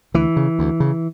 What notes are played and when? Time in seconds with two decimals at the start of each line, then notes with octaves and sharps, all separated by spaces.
0.14 D2 E3
0.36 C#3
0.59 D2
0.80 C#3